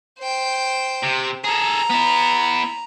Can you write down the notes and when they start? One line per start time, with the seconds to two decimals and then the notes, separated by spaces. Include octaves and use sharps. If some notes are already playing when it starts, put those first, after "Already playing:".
0.19 C5 G5
1.03 C3
1.44 G#4 A4 A#5
1.90 B3 E4